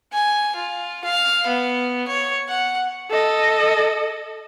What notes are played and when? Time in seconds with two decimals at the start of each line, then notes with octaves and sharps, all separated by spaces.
0.13 G#5
0.56 F4
1.05 F5
1.47 B3
2.08 C#5
2.49 F#5
3.10 A4 D#5